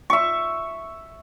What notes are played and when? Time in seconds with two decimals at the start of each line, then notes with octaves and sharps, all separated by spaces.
0.10 E5 C#6